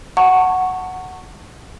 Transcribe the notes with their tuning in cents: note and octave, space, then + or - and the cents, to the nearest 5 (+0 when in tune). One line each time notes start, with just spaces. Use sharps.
F#5 +0 A5 +35 C#6 -5